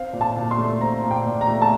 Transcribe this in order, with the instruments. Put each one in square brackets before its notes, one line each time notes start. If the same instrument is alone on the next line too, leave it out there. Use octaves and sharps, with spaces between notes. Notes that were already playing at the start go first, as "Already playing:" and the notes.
Already playing: [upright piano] C4 F5
A#2
A5
A#2
C6
A3
C4 A#5
A#2
G5
A#2
A#5
A3
A5